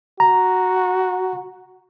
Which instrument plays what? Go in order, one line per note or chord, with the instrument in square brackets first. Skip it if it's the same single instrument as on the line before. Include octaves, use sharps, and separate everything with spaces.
[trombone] F#4 [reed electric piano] A#5